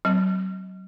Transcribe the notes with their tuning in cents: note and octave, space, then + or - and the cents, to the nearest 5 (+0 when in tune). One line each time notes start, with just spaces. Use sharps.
F#3 +30 C4 +0